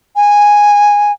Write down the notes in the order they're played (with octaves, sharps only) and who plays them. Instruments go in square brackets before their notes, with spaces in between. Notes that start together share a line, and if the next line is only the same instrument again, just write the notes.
[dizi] G#5